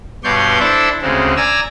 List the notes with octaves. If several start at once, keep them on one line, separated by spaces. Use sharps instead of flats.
G2 B2 C#5 D5 C6 G6
D4 E4 A4 C5 D5 E5
D2 C#3 G#3 C4
D5 G#5 A#5 E6